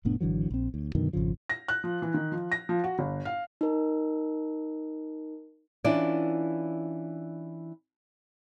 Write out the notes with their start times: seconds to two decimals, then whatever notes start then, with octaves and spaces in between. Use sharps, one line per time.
0.05 F1 A2 B3 D4
0.21 G#1 D3 E3 F#3
0.51 A#1 C4
0.74 D2
0.95 F#2 B2 D3 D#3
1.13 G#1 F2 C#3 F3
1.49 A#6
1.68 F#6
1.84 F3
2.02 E3
2.14 D#3
2.32 F3
2.52 A#6
2.69 F3
2.84 F#4
2.99 G1
3.25 F5
3.61 D#4 A#4
5.84 E3 C#4 D4 E4 F4 D5